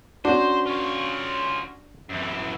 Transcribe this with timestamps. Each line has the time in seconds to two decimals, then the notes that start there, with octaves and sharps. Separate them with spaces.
0.25 C#4 D4 F#4 C5
0.66 F4 C#5
2.09 F#2 E3